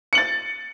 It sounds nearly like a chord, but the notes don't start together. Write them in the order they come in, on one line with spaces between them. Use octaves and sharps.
C#7 F#7 A6